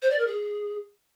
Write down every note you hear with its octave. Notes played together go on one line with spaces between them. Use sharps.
C5
D5
A#4
G#4